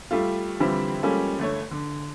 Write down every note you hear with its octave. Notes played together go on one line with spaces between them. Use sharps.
G3 A3 F4
D3 E3 F3 G3 C4 E4
F3 G3 G#3 A#3 C#4 A4
G1 A3 C#5
D3